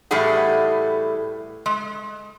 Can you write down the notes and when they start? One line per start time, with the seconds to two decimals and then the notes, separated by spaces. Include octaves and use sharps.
0.11 A2 E3 G3 A3 G#4 F#5
1.66 G#3